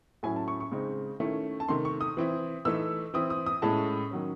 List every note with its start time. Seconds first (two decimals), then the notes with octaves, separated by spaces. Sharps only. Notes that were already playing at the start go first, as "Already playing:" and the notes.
0.23 A2 F#3 C#4 E4 G#5
0.36 A5
0.48 C#6
0.60 C#6
0.71 C#3 G#3 C4 D#4
1.20 D#3 A3 C#4 E4
1.60 A5
1.68 C3 D#3 A3 C6
1.85 C#6
2.01 D#6
2.17 E3 C4 E4
2.65 E3 A3 D#4 E6
3.14 E3 C4 E4 D#6
3.30 D#6
3.46 D#6
3.62 A2 G#3 C#4 E4 A5
4.11 D#3 F#3 C#4